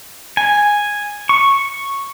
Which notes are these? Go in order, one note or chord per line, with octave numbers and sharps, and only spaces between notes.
G#5
C#6